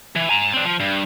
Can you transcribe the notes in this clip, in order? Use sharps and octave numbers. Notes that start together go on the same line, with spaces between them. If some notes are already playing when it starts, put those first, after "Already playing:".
E3
G#5 A#5
C4 D4
F3
G2